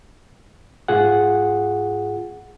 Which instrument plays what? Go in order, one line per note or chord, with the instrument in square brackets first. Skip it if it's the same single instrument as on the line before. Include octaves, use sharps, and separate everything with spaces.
[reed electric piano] G#2 F4 G#4 F#5